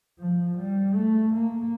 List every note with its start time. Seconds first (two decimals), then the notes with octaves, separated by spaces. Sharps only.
0.19 F3
0.57 G3
0.95 A3
1.33 A#3